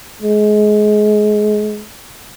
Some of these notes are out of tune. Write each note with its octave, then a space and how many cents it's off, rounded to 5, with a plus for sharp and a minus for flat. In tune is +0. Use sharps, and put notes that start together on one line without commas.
G#3 +25